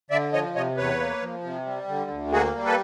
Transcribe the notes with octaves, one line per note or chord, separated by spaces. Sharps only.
D3 D5 E5
F3 C#5 D#5
C3 C#5 D#5
E2 B4 C#5
A#3
F3
C3
G3
D3
D2
A#3 F#4 G#4
G3
A4 B4